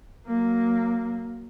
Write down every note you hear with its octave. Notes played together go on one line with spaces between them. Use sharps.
F#3 A#3